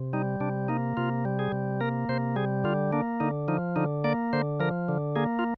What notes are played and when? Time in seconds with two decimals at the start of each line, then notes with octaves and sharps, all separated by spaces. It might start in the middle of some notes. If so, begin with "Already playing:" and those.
Already playing: C3
0.13 G3 D#4
0.40 C3 D4
0.68 A#3 D#4
0.97 C3 F4
1.25 G3
1.39 G#4
1.52 C3
1.81 A#3 A#4
2.09 C3 C5
2.36 G3 G#4
2.64 D3 F4
2.92 A#3 D4
3.20 D3 D#4
3.48 F3 D#4
3.76 D3 D#4
4.04 A#3 D5
4.33 D3 C5
4.60 F3 A#4
4.89 D3
5.16 A#3 G#4
5.39 F4